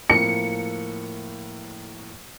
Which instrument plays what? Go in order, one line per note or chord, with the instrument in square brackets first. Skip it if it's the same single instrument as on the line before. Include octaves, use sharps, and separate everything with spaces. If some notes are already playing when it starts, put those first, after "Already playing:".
[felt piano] A2 F3 A#3 [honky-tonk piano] C#7